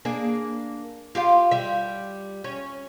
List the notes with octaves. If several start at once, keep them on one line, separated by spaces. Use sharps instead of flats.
A#3 D4 G#4
F4 G4 F5
G3 E5
C#4